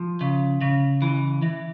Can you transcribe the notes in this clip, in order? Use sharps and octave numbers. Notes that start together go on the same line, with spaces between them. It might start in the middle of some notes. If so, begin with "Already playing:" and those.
Already playing: F3
C#3
C#3
E3
E3